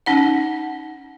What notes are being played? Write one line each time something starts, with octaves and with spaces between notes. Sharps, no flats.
C#4 D#4 F#5